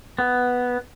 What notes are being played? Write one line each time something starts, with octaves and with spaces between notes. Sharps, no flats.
B3